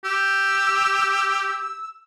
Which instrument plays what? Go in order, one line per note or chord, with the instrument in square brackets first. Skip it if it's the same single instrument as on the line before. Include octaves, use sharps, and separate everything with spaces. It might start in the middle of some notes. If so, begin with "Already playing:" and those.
[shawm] G4 [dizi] E6